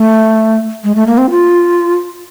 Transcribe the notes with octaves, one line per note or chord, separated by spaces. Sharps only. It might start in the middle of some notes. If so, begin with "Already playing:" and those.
Already playing: A3
G#3
A3
A#3
C4
F4